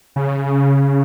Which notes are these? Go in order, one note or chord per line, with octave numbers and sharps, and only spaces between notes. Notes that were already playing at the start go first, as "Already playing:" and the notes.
C#3